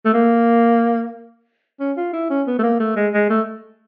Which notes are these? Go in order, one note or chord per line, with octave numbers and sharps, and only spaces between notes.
A3
A#3
C#4
F4
E4
C#4
B3
A3
A#3
A3
G#3
G#3
A3